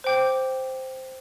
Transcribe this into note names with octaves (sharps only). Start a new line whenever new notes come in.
C5 G5 D6 G6